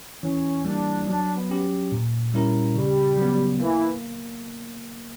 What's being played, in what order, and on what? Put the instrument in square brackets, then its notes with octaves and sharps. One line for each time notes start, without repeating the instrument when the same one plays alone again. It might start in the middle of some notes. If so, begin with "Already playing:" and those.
[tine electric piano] E3 [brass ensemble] C#4
[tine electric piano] G3 A#3 [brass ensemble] D4
[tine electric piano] F#3 [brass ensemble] D4
[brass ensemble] B3
[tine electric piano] C#4 G4
A#2
G3 C#4 E4 A#4
[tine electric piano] C#3 [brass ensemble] G3
[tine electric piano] F#3 B3
[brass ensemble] E3 [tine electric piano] A#3